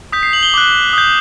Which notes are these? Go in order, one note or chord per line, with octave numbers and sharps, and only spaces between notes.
D#6 G6 B6
C7
F#7
G7
D6 F#6
D#6 G6